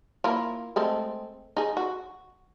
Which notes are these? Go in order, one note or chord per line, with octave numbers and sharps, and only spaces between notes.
A#3 E4 F4
G#3 A3 C4
D#4 G#4
F#4